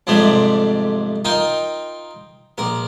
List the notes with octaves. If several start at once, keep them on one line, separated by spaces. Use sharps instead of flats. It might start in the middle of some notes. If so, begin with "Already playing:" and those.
F2 G#2 C3 G3 A3 D4
D#4 F4 A#4 G5
A#1 A#4